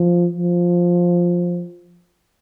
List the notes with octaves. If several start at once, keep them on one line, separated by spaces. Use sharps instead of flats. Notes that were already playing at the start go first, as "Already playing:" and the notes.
Already playing: F3
F3